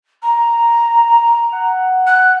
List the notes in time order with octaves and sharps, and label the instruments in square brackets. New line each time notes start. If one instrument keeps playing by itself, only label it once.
[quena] A#5
[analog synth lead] F#5
[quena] F#6